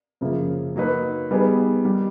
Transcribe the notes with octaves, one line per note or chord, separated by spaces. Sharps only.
F#2 C#3 F3 A#3
F#3 A#3 D#4 F#4 B4
G3 B3 D#4 G#4 B4
D#3 G3